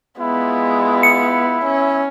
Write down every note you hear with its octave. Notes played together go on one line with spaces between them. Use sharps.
G#3 B3 E4 F4
C#7
C#4 E5